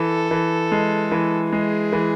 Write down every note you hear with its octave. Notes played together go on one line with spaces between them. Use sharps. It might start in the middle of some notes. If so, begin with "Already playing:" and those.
Already playing: E3 A4
E3
G#3
E3
G#3 G#4
E3